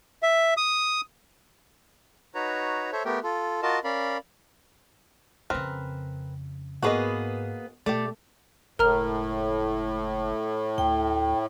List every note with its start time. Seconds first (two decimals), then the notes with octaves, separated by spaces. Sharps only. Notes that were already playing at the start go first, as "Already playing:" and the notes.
0.23 E5
0.57 D#6
2.35 D#4 F#4 B4 C#5 A#5
2.92 A4 C5 C#5 E5
3.05 A3 B3 G4 A#4 G5
3.23 F4 A4
3.63 F4 F#4 A#4 D#5 A5
3.84 C#4 A#4 D5 F5 B5
5.50 F2 C#3 C4 A#4 B4
6.82 G#2 A#3 B3 F#4 G#4 B4 D#5
7.86 B2 A3 G4 D5
8.79 F#1 A2 A#4 A#5 F6
10.78 D2 G5